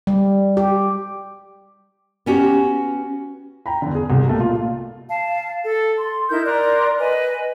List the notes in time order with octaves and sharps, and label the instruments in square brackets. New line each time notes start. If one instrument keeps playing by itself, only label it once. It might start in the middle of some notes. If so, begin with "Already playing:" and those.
[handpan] G3
G4
[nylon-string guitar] B3 C#4 F#4 G4
[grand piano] G5 A#5 B5
E2 D3
G#4
C2 C3
B2 G3 A3 A#3
A#2 F4
[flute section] F5 A5
A4
C6
D#4 E4 A#4 G6
A#4 D5 C6 F#6
B4 D#5 G#5